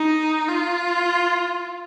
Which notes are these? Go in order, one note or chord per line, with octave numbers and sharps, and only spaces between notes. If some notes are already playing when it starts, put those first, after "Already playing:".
Already playing: D#4
F4